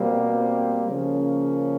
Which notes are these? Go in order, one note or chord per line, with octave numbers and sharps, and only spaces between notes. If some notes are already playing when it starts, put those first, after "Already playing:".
Already playing: B2 G3 A#3 C4
C4
C#3 F3 A#3 C#4